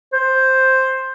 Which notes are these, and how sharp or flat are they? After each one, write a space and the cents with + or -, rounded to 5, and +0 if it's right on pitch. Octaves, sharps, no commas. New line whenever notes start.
C5 +5